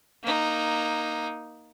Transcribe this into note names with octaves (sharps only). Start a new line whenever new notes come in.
A#3 D#4